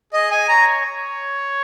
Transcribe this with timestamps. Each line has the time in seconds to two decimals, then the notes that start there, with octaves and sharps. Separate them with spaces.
0.13 G#4 D#5
0.31 G#5
0.48 C#5 A#5
0.85 C#5